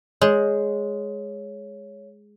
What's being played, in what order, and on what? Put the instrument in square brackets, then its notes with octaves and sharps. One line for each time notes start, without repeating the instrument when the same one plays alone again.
[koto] G#3 [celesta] C#5